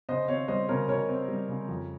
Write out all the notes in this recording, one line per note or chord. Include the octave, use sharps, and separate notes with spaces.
C#3 C5 D#5
D#5
C4 C#5 F5
G3 C5 D#5
C#3 A#4 C#5
C#3 A#4 C#5
C4
G3
C#3
F2